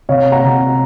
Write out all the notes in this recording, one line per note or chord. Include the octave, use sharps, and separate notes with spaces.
C3 C#5 F5
F#5 A#5
C3